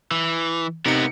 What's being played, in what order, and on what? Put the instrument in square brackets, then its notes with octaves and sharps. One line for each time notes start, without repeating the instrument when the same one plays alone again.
[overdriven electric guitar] E3
[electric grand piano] C3 D#4 C#7 [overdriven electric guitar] B3 A#4